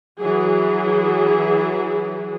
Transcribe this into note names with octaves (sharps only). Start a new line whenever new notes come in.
E3 F#3 G#4